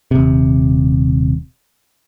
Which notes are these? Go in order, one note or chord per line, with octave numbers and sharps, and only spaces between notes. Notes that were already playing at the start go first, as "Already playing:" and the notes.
D#1 C3